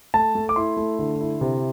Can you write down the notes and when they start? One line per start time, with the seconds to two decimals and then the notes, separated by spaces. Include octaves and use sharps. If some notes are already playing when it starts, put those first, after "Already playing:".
0.14 A3 A5
0.35 A3
0.49 D6
0.56 E4 C6
0.77 A3
0.99 D3
1.20 E4
1.41 C3